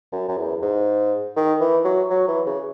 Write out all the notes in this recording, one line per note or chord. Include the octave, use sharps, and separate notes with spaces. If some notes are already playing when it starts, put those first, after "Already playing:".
F#2
F#2
E2
G#2
D#3
E3
F#3
F#3
E3
C#3